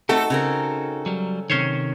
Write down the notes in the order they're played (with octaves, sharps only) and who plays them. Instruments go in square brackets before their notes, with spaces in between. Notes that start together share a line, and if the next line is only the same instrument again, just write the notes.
[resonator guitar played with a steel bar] A3 C4 [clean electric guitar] D#4 F#4 [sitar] A4
[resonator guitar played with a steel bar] C#3 C4 A#4
[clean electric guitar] F#3 G3
[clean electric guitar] C3 D#3 [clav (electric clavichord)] C#4 C5 C#5